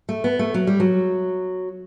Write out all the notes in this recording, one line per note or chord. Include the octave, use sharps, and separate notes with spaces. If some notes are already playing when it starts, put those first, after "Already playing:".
A3
B3
A3
F#3
G3
F#3